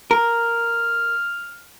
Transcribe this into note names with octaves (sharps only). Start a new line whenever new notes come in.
A#4 F6